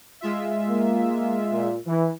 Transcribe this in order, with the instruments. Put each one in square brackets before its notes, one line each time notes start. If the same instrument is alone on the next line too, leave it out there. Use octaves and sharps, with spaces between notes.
[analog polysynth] G#3 F4 E5
[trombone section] A#3
A#2
E3